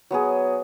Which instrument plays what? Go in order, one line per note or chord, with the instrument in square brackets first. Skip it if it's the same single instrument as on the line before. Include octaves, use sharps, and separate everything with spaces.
[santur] F#3 B3 G#4